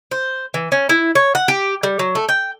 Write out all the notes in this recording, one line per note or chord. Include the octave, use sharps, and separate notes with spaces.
C5
E3
C#4
E4
C#5
F#5
G4
G3
F#3
A3
G5